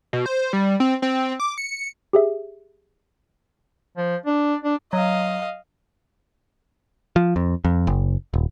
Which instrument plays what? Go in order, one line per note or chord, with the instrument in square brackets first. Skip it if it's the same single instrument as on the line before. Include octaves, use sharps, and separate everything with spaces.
[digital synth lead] B2
C5
G3
C4
C4
D6
C#7
[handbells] G4 G#4 E5
[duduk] F3
D4
D4
[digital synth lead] F#3 [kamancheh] D#5 F5
[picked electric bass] F3
F2
F2
F#1
D#1